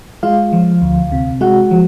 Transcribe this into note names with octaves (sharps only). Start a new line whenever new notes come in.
G#3 F4 F5
F3
D2
C3
G#3 F#4 F#5
F3